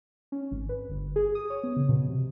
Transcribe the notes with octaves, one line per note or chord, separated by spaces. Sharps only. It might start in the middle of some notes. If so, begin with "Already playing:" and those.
C#4
G#1
B4
G1
G#4
D#6
C#5
B3
C#3
B2
C3